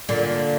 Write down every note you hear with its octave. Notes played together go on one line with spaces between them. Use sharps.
A#2 D3